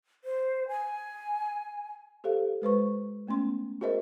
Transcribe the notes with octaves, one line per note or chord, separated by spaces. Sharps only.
C5
G#5
G4 A4 C5 F5
G#3 B4 C5 C#6
A3 B3 C#4 C6
F#4 G#4 A#4 C5 D#5 E5